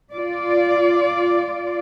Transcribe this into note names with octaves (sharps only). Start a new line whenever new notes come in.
F4 D5